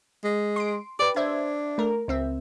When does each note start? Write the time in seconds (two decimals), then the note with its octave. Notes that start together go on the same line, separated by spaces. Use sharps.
0.24 G#3
0.56 C6 D7
0.99 G4 B4 D5
1.16 D4 C5 E5 G#6
1.78 A3 A#4
2.08 C#2 C4 E5